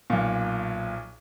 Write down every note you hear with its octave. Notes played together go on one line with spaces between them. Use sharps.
B1 A#2